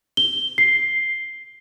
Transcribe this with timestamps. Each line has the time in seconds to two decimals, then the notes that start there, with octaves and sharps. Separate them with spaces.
0.17 G7
0.58 C7